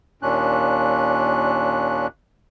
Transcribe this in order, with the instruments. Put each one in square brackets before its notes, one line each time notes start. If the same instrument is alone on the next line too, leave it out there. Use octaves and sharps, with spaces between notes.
[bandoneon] D#2 A#2 C#4 D4 F#6